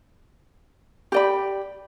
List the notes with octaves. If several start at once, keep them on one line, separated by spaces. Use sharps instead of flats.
G4 D5 B5